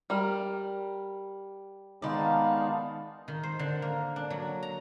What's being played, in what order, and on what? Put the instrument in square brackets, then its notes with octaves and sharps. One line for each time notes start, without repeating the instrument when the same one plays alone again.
[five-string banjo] G3 A#4
[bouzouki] D#3 D5 [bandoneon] G#3 B3 D#4 [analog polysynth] F5 A5
[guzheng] D#3
C5
D3
A#3
D4
F#3
A#5